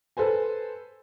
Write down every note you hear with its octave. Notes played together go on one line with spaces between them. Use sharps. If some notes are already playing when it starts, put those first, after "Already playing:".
A4 B4 C5 G#5